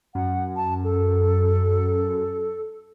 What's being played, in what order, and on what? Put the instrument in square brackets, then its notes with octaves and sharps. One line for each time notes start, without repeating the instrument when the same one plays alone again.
[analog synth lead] F#2 [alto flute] F#5
[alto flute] A5
A4